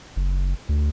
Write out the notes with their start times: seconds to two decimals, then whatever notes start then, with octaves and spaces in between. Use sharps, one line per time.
0.16 F#1
0.69 D2